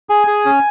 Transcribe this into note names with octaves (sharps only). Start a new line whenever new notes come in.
G#4 G#5
G#4
C#4